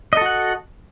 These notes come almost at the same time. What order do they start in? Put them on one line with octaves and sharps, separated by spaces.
D#5 A4 F#4 F#5